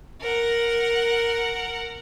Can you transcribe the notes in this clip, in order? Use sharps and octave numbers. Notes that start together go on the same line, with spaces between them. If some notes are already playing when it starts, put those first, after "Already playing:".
A#4 F#5